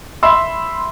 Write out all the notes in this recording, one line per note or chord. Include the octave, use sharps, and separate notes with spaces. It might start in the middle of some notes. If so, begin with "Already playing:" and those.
E5 B5 C6 E6